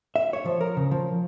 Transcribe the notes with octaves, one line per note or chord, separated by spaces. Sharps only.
E5
C#5
F3
A#4
C#3
F3